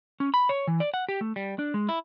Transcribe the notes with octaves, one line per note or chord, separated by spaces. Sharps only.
C#4
B5
C#5
E3
D5
F#5
G4
A3
G3
D4
G#3
E4